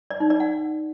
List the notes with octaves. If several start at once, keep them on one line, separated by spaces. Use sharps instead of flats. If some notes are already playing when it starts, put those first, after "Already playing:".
D5
D#4
D5
F#5